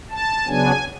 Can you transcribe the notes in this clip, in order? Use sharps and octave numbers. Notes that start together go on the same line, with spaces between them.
A5
C#3 F#3 B3 D4 G#5